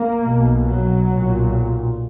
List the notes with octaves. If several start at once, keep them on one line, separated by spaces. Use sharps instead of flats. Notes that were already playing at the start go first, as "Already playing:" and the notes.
Already playing: A#3
B1 B2
F#3
B1 A#2